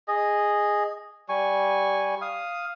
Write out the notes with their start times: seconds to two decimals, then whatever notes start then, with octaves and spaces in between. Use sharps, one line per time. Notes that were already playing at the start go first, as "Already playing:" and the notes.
0.08 G#4 D#5
1.29 G3 G#5 C#6
2.22 F5 D#6